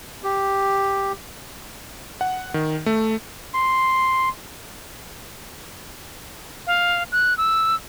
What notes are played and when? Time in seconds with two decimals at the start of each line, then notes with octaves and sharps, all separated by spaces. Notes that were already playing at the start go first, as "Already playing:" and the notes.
0.23 G4
2.21 F#5
2.54 D#3
2.86 A3
3.54 C6
6.67 F5
7.12 F#6
7.38 E6